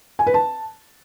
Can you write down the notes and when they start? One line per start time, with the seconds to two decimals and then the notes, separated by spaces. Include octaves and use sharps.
0.19 G#5
0.27 B4
0.34 A5